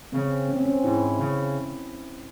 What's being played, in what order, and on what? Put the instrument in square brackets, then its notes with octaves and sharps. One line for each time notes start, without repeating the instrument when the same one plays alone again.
[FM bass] C#3 [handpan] C4
[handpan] C#4
C4
C#4
[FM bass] G#2 [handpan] E4
[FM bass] C#3